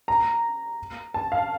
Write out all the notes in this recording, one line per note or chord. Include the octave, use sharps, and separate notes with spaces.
A#5
A5
F5